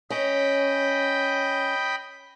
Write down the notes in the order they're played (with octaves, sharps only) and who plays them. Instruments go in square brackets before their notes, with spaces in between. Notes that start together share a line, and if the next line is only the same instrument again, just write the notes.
[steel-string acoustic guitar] C#4 [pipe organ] D#5 G5 B5